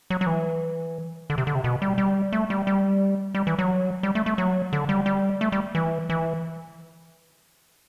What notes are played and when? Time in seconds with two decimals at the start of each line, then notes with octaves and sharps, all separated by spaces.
0.10 F#3
0.21 F#3
0.27 E3
1.30 D3
1.38 C3
1.47 D3
1.55 C3
1.64 B2
1.82 G3
1.98 G3
2.33 A3
2.50 G3
2.67 G3
3.35 G3
3.47 E3
3.59 F#3
4.03 G3
4.15 A3
4.26 A3
4.38 F#3
4.73 D3
4.89 G3
5.06 G3
5.41 A3
5.52 G3
5.75 E3
6.10 E3